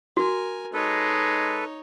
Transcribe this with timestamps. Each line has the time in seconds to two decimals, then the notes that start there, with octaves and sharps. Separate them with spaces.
0.17 F#4 A#4 G#5
0.73 G#3 D#4 A4 B4 C#5